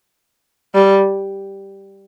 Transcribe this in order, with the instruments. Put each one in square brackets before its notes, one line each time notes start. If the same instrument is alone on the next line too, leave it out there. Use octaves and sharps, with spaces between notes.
[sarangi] G3